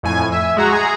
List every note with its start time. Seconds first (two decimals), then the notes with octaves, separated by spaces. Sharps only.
0.03 F2 A2 G#5
0.32 E5
0.57 G#3 F#4 A#5
0.72 G#4 A#5